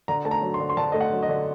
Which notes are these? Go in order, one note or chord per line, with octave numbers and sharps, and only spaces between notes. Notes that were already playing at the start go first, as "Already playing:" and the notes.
D3 A#5
A3 A5
A#5
F#3
C6
D3
C6
D3 A5
A3 D#5
F#5
F#3
D#5
D3